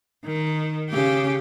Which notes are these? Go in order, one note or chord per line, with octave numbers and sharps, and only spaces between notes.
D#3
C#3 G4